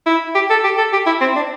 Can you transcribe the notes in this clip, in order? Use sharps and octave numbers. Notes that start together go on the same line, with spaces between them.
E4
G4
A4
G4
A4
G4
E4
C4
D4